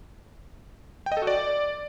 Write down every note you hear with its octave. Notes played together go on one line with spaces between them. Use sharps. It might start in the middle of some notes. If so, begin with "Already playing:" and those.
G5
D#5
A4
F#4
D5